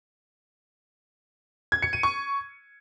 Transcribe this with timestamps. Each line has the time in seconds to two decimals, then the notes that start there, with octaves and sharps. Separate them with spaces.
1.72 G#6
1.82 C#7
1.93 D#7
2.03 C#6